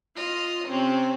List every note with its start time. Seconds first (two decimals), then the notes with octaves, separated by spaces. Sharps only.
0.14 F4 D#5 F6
0.68 C3 C4 C#4